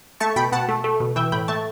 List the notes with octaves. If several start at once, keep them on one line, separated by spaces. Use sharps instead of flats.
A3 A5 C#6
B2 G5 B5
B2 F#5 A5
A3
A3
B2
E3 E5 G5
A2 G5 B5
A3 A5 C#6